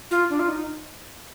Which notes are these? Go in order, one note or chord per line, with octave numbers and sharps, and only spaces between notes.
F4
D4
F4
D#4